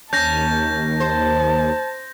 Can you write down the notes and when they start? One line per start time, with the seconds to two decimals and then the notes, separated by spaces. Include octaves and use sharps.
0.13 D#2 C#4 A5 G6 A#6
1.00 C5 A5